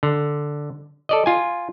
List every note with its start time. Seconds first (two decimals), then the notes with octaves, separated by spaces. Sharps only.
0.03 D3
1.09 A4 D5 D#5
1.26 F4 G#5